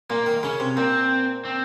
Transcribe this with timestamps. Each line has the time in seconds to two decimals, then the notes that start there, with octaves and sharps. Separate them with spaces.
0.10 A#2 A#3
0.26 D#3
0.43 C#3 C#4
0.60 C3
0.77 A#2 C4
1.45 C4